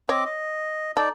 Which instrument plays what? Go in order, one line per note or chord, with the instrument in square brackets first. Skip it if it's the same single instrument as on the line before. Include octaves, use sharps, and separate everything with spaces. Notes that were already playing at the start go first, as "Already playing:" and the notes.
[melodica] C4 D#5 D6 [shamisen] C#5
[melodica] D#5
[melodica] D#4 D5 [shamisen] A4